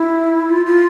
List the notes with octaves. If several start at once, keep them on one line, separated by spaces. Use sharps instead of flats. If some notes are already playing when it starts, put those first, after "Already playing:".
Already playing: E4
F4
F4